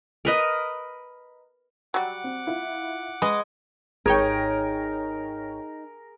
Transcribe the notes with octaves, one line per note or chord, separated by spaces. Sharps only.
A#4 B4 D#5
F#3 G3 F#5 D6
C4
E4 F4
G#3 G#4 B4 D#5
G#1 D#4 G#4 A#4 C#5 G5